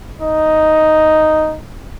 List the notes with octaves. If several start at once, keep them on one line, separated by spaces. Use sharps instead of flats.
D#4